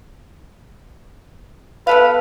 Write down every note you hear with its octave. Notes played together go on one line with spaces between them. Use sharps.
B3 A4 B4 F5